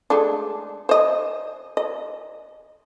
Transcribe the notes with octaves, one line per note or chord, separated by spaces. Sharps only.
G#3 A3 D4
C5 D#5
D#5